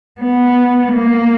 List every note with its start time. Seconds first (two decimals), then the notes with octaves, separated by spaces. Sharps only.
0.20 B3
0.92 A#3